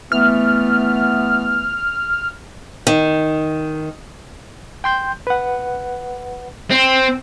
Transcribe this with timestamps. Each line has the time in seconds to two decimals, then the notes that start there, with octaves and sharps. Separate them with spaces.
0.12 E3 A3 B3 F6
2.87 D#3
4.84 G5 C6 G6
5.27 B4 F#5
6.71 C4